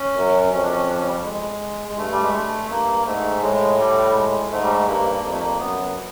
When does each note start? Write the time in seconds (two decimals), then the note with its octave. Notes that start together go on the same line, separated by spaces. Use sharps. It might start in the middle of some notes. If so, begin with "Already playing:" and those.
Already playing: C#4
0.16 F#2
0.53 F2 C#4
0.63 D4
0.73 C#4
0.89 D4
0.98 C#4
1.07 G3
1.25 G#3
1.88 G#3
1.98 G2 A3
2.12 G3
2.23 G#3
2.34 A3
2.70 G2 A#3
3.06 G#2 A3
3.42 A2 G#3
3.79 G3
4.15 G#3
4.51 G#2 A3
4.63 G3
4.71 G#3
4.80 A3
4.88 G2 A#3
5.24 F2 A#3
5.31 A3
5.38 A#3
5.60 F#2 B3